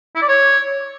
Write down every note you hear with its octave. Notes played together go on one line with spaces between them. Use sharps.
E4
D5
C#5